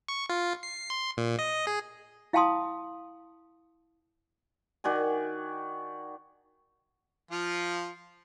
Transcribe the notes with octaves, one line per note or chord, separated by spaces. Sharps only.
C#6
F4
C7
C6
A#2
D#5
G#4
E4 F5 G5 A5 C6 D#6
D#3 F#4 D5 G#5
F3 F4